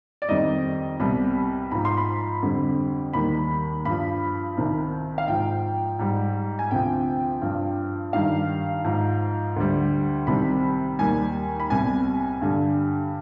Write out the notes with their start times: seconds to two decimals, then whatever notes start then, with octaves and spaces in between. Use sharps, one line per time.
0.22 D5
0.29 F2 D#3 G3 D#5
1.00 C2 B2 G3 B5
1.71 G#2 F3 B5
1.85 C6
1.97 B5
2.43 F2 D3 G3
3.13 D#2 D#3 G3 B5
3.85 G2 F3 B5
4.57 C2 C3 D#3
5.18 F5
5.28 G#2 F3 G5
5.99 G#2 G3
6.59 G#5
6.71 D2 C3 F3 G5
7.42 G2 F3
8.13 G2 D#3 G3 F5
8.85 G#2 F3
9.56 D2 D3 G3
10.27 C2 C3 D#3 G3 B5
10.99 D#2 D#3 G3 G#5
11.60 B5
11.70 C2 B2 G3 G#5
12.41 G2 D3 G3